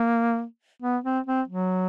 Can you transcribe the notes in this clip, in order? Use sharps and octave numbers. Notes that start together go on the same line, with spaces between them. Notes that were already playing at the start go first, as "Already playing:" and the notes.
Already playing: A#3
B3
C4
C4
F#3